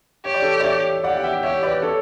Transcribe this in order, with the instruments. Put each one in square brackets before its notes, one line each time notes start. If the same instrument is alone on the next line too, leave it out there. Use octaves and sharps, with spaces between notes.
[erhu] G4 [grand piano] C#5
[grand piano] D5
A4 C#5
D5
C#5 E5
[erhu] G4 [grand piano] D5 F#5
[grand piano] F#5
E5 G5
[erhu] G4 [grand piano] C#5 E5
[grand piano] B4 D5
A4 C#5